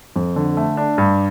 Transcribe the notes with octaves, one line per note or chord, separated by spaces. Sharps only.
F2
D3
A3
D4
G2